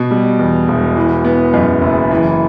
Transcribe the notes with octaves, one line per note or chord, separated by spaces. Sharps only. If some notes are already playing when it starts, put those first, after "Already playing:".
Already playing: B2
G3
E2
E1
E3
B3
F#2
F#1
E3